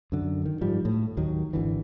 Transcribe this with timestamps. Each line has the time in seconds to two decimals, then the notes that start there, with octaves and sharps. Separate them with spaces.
0.12 F#2 D3
0.45 D#3
0.61 G#2 F3 G3
0.85 A2
1.17 D#2 D#3 F#3
1.53 G#1 D3 E3